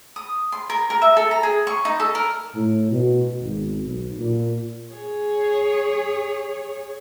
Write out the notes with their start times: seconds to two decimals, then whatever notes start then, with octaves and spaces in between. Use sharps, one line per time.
0.16 D#6
0.52 C6
0.70 A#4
0.90 A#4
1.02 E5
1.17 A4
1.31 A#5
1.43 G#4
1.67 C#6
1.85 D#4
2.00 A4
2.15 A#4
2.55 A2
2.92 B2
3.42 G#1
3.86 B1
4.18 A#2
4.93 G#4 C#5